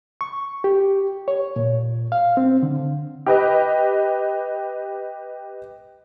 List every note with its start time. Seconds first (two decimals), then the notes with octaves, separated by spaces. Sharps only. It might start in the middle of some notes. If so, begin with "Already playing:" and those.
0.21 C#6
0.64 G4
1.28 C#5
1.56 A#2
2.12 F5
2.37 C4
2.63 D3
3.26 G4 B4 D#5